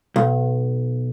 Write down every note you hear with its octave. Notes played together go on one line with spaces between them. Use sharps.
B1